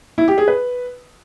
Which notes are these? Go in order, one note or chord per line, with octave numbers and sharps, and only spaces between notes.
E4
G4
G#4
B4